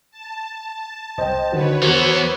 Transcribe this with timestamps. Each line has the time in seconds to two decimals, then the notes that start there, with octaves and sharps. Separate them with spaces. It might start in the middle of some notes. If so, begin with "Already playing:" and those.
0.11 A5
1.18 C2 C5 D#5 G5
1.52 D3 D#3 F#4 B4 C#5
1.82 E3 B3 F#4 A#4 C5